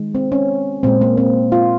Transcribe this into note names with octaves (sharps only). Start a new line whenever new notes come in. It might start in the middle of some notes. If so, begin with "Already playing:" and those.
Already playing: D#3 G#3
C4
C#4
A#2 G#3 C4
A#3
C4
F4